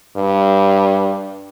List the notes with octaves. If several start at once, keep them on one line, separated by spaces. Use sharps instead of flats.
G2